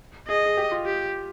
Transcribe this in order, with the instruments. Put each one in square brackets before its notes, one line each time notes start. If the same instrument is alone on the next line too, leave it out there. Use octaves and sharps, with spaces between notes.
[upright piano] G#4 [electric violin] D#5
[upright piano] G#4
G4
F4
[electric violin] G4